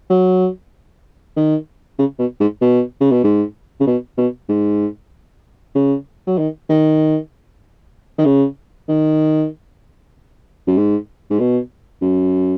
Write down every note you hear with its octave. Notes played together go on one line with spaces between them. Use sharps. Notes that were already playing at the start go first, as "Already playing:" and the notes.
F#3
D#3
C#3
B2
G#2
B2
C#3
B2
G#2
C#3
B2
B2
G#2
C#3
F#3
D#3
D#3
D#3
C#3
D#3
F#2
G#2
G#2
B2
F#2